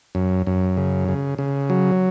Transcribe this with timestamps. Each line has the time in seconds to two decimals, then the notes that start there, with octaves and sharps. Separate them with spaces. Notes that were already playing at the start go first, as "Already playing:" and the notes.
0.15 F#2
0.47 F#2
0.77 C#3
1.08 C#3
1.38 C#3
1.70 F#3